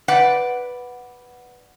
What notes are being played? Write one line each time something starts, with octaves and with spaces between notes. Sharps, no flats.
B4 D5 F#5